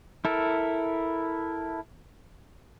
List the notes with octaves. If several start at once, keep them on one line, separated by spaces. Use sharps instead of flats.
E4 A4 A#4